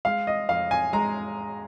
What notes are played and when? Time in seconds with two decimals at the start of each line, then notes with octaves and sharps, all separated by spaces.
0.05 G#3 F5
0.27 D#5
0.49 F2 F5
0.71 G#5
0.93 G#3 A#5